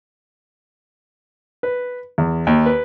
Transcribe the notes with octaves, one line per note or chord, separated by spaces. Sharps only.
B4
E2
D#2
B4